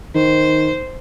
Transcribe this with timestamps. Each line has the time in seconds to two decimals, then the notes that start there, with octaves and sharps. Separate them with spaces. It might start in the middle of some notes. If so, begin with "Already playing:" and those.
0.15 D#3 C5